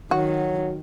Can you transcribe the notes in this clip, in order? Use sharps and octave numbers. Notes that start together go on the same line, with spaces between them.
D#3 F#3 F#4